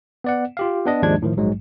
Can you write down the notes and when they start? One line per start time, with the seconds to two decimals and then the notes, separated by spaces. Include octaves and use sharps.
0.24 B3 D5 F#5
0.57 F4 G4 F5
0.86 B3 D4 D#5
1.02 D#2 G#2 F3 G#3 D4 G#6
1.22 A2 D#3 F3
1.36 A#1 G#2 F#3 G#3